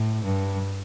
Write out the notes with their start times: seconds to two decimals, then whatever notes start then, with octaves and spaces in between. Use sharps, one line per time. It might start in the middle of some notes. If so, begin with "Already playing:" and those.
Already playing: A2
0.24 G2